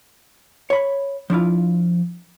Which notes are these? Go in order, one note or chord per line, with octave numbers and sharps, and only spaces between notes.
C#5 B5
F3 D4 E4 F4